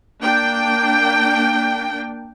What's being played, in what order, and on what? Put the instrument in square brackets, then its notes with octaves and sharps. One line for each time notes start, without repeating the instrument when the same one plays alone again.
[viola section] A#3 D4 G5